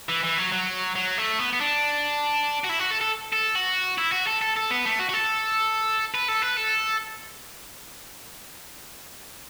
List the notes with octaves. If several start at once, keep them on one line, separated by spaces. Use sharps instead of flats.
E3
E3
F#3
F#3
F#3
A3
B3
B3
D4
F#4
E4
F#4
A4
A4
A4
F#4
E4
F#4
A4
A4
A4
B3
A3
F#4
F#4
A4
B4
A4
B4
A4